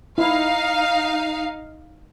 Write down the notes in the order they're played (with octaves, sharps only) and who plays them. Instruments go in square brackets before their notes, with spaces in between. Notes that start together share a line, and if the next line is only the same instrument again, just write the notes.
[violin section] D#4 F5 [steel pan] E4